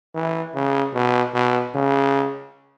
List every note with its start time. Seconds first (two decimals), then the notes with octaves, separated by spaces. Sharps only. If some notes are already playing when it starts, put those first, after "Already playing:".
0.15 E3
0.55 C#3
0.94 B2
1.34 B2
1.75 C#3